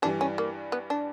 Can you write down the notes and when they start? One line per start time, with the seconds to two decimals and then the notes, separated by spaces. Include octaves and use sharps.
0.02 G2 E3 G3 D4
0.21 C#4
0.38 A#3
0.72 B3
0.90 D4